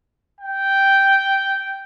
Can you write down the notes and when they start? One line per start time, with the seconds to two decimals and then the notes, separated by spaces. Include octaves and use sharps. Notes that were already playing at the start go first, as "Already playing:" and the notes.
0.41 G5